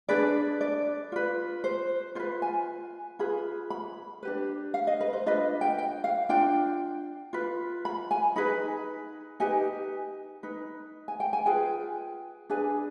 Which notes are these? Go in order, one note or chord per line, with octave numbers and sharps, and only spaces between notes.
D4 G#4 B4 D5
D5
F4 B4
C5
F4 B4 C5
G#5
F4 G#4 B4 B5
B5
D4 G4 B4
F5
D#5
B4
C5
D4 F4 B4 D#5
G5
G5
F5
D4 F4 G5
F4 B4
B5
G#5
D#4 G#4 B4 B5
D#4 G4 B4 G#5
D#4 B4
G#5
G5
G#5
F4 G#4 B4 G5
D4 G#4 B4 G#5